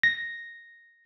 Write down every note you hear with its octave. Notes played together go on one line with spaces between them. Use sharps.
A#6